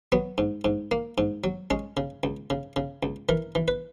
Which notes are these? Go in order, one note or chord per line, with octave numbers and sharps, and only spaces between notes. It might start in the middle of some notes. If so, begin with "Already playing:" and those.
F#3 B3
G#2
G#2
A#3
G#2
F#3
G#3 C#4
C#3
C#2
C#3
C#3
C#2
E3 A#4
E3
B4